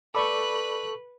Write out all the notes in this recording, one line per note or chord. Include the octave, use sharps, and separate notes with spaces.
A4 B4 D5 B5 C#6 D6 F#6